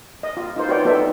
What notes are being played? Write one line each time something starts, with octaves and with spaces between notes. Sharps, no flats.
D#5
F4
D#4 F4 C5
F#4 B4 C#5 D5 G5
B3 D#4 A4 D5 E5 G5